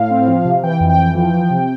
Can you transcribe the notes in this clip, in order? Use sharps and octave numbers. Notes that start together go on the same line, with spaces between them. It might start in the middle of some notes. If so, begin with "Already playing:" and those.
Already playing: A2 F5
C4
F3
C3
E3 G5
F2
G5
E3
F3 G5
F3
C3